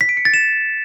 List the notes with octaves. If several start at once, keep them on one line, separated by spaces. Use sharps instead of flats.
B6
D7
C#7
A6
E7